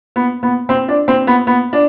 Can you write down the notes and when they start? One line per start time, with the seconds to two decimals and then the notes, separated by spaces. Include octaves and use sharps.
0.16 B3
0.43 B3
0.69 C4
0.88 D4
1.08 C4
1.27 B3
1.47 B3
1.73 D4